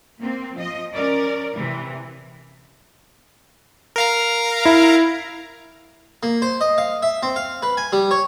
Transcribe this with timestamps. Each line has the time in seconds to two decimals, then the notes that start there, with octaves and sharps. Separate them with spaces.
0.19 A#3 C4
0.56 F3 D#5
0.93 C#4 A#4 D5
1.55 C3 E3
3.96 A#4 F5 A#5
4.65 E4
6.23 A#3
6.42 C5
6.61 D#5
6.78 F5
7.03 E5
7.23 C4
7.36 F5
7.63 B4
7.77 G#5
7.92 G3
8.11 C#5